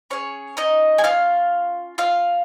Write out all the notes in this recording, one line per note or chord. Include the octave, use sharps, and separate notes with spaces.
C#4 G#4 C#5
D#4 D#5
G#5
F4 F5
F4 F5